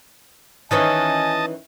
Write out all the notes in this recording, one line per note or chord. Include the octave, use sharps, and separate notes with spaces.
D#3 E3 C#4 D#5 G#5 A5